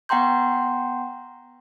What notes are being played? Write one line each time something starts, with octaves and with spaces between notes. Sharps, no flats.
B3 F#5 G5 A#5 C6 G6